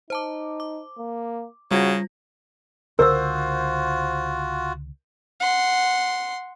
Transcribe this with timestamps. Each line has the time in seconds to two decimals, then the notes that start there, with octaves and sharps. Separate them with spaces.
0.10 D#4 C5 A5 D6
0.60 D6
0.98 A#3
1.71 C#3 G3 F4 F#4 A#6
2.99 C#2 D3 F4 F#4 A#4 C5 E6
5.40 F#5 C6